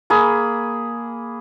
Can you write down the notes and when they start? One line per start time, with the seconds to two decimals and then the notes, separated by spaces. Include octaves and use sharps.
0.10 A#3 G#4 B5